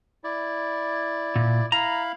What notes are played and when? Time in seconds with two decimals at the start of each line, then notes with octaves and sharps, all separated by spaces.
0.24 E4 D5
1.36 A#2
1.72 E4 F5 A#5 B5